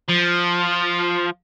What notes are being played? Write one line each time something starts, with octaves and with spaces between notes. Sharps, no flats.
F3